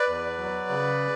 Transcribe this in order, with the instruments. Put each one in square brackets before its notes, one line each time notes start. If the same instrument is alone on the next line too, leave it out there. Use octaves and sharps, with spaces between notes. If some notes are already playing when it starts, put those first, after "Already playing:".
Already playing: [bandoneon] B4 D5
E2
F#3
C#3